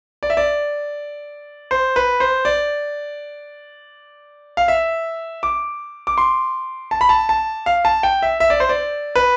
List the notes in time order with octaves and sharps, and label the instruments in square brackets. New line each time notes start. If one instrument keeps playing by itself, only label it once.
[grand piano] D5
E5
D5
C5
B4
C5
D5
F5
E5
D6
D6
C6
A5
B5
A5
A5
F5
A5
G5
E5
E5
D5
C5
D5
B4